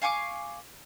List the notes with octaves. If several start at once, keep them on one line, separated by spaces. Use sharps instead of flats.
F5 G#5 C#6 D6